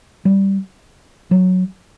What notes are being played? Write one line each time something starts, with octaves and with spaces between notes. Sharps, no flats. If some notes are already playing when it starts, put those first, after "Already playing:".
G3
F#3